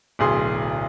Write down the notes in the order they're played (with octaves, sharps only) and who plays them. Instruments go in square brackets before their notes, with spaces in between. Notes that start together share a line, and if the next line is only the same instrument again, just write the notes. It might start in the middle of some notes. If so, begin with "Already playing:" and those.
[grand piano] D1 B1 G#4 C6